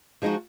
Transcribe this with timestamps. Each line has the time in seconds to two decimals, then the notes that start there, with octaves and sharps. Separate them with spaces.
0.22 F3 G#3 D#4 F#4